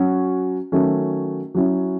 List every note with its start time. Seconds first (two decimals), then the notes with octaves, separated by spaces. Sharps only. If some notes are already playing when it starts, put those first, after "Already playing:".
Already playing: F#3 C#4 F#4
0.72 D#3 F#3 A3 C#4
1.55 F#3 C#4 E4